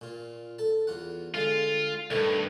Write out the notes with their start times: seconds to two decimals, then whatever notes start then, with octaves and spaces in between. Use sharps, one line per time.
0.01 A#2 F4
0.58 A4 A5
0.87 E2 F4 F#5
1.34 D3 G#3 F4
2.10 C2 G2 D#3 A3 B4